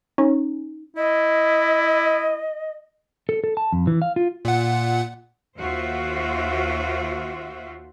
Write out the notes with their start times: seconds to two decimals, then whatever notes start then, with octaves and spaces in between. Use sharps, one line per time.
0.18 C#4 D#4
0.97 E4 D#5
3.29 A4
3.44 A4
3.57 A5
3.73 F2
3.87 E3
4.02 F5
4.16 F4
4.45 A#2 F#5
5.57 D#2 F4 F#4 C5 E5